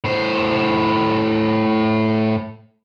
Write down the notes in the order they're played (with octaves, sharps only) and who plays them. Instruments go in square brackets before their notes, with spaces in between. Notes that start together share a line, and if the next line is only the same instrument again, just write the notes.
[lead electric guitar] A2 C5